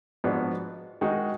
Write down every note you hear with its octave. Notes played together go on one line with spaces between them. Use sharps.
G#2 F3 B3 D4 F#4
D#3 G#3 D#4 F#4